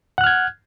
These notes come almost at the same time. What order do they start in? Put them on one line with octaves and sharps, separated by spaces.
F#5 F#6 F6 G#6